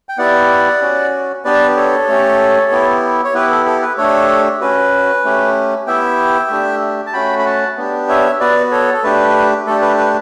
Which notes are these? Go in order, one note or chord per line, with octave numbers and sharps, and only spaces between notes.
G5
B3 E4 G4 D5 F#5
C#4 F#4
B3 D4 G4 B4 D5
A4 C#5
A3 C#4 G4
B3 E4 G4
C#5
B3 E4 G4 B4
A4
A4
B4
A3 D4 G4 A4 C#5
C#4 F#4 B4
A3 C#4 G4
B3 E4 G4 E5 G5
A3 D4 G4
A5
A3 C#4 F#4 G5 B5
B5
F#5 A5
B3 D4 G4
C#5 E5
B3 F#4 B4 D5
A4 C#5
A4
A3 D4 G4 B4
A3 D4 G4 A4
B4
B4